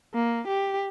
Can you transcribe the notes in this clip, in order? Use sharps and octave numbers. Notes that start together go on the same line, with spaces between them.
A#3
G4